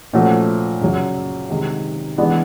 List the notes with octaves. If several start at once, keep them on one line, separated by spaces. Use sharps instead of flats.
A#2 F3 A3 C#4 F#4
F#2 C#3 F#3
C3 D#3 G#3
E3 G#3 B3 D4